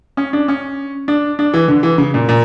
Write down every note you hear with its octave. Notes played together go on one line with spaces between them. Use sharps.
C#4
D4
C#4
D4
D4
E3
D3
E3
C#3
A#2
A#2